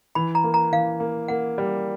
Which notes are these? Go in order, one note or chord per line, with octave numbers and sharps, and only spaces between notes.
E3 B5
A#5
A#3
A#5
E3 F5
A#3
A#3 F#5
G3